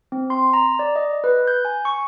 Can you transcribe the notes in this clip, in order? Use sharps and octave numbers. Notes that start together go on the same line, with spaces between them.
C4
C6
A#5
D5
D#5
B4
G6
G#5
C#6